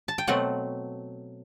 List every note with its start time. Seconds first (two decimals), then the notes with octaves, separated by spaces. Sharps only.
0.08 A5
0.18 G5
0.27 B2 F#3 A3 C4 F#5